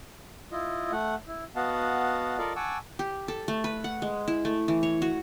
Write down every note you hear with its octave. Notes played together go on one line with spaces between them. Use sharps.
E4 F4 D#5
A3 F#5
E4
B3 F#4 D#5 F5 F#5 A5
F4 A4 A#4 D5 D#5 F5
F#5 G#5 A5 C#6 D6 E6
G4
A4
A3
B4
F#5
G#3
E4
A3
E3
C#5
F#4